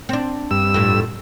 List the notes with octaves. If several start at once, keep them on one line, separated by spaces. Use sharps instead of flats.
C4 D4
G2 E6
F2 A2